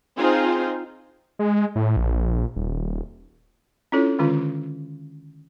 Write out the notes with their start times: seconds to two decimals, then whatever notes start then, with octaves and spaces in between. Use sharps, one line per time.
0.17 C4 D#4 F4 G#4 C5
1.39 G#3
1.75 A2
1.97 A#1
2.56 D#1
3.92 C#4 D4 E4 F4 A4 C#5
4.19 D3 D#3 G#3 C#4 F4